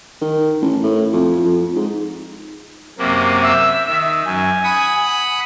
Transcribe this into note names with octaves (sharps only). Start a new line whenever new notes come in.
D#3
A1
A2
F2
F2
G#2
F#2 C3 A#3
E5
D#3
F#2 G#5
F#5 B5 D#6